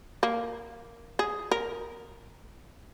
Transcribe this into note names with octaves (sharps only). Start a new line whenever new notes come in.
A#3
G#4
A#4